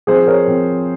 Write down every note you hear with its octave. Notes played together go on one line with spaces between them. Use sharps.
F3 C4 G#4 C5
A#4 C#5
F3 C4